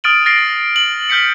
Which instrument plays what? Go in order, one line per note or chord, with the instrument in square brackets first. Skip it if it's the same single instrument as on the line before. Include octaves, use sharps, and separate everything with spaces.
[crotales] D#6 F6 A6 D7 D#7 F#7
F6 A6 A#6 C7 D7 G7
F#7
F6 G6 B6 C#7